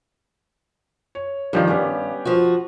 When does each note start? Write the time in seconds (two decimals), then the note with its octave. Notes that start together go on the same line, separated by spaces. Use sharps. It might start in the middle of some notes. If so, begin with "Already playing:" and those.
1.15 C#5
1.53 G2 D#3 F3 G3
1.69 B3 C#4 G4
2.25 F3 F#4